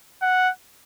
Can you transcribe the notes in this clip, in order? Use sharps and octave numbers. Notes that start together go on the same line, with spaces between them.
F#5